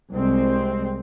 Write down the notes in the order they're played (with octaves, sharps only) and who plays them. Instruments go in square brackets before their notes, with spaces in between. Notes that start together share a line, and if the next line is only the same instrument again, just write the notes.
[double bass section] C2 G#3 C4